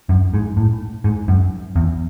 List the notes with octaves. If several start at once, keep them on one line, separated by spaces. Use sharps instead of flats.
F#2
G#2
A2
G#2
F#2
E2